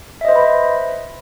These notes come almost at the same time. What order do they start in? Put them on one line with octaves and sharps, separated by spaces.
E5 D#5 C5 B4 B5